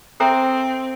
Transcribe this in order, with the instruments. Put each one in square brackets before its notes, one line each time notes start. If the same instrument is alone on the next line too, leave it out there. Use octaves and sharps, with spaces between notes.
[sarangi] C4 [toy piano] A4 C5 E5 G5 A#5